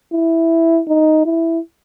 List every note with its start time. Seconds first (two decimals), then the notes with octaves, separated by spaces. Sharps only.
0.13 E4
0.88 D#4
1.25 E4